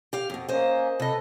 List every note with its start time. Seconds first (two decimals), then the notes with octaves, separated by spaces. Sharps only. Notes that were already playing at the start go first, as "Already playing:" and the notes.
0.13 G4 F5
0.30 F2 B2
0.49 A#3 C#4 C5 D#5
1.00 C3 A4 B4 D#5